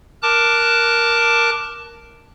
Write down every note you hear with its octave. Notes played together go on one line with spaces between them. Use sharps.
A#4 A5 D6 F#6